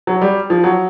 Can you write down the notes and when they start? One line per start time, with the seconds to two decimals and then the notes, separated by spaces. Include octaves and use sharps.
0.07 F#3
0.21 G3
0.50 F3
0.64 F#3